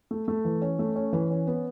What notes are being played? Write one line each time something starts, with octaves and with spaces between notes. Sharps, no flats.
A3
A3
E3
C#4
A3
C#4
E3
C#4
B3